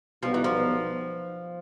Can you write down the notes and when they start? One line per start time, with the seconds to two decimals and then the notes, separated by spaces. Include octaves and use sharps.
0.23 B1 B2 F3 G3 B3 D#4
0.34 E3
0.44 F3